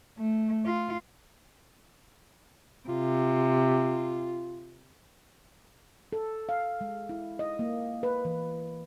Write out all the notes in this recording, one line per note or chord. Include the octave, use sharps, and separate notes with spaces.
A3
F4
C3 F4
A4
F5
G#3
E4
D#5
A#3
B4
E3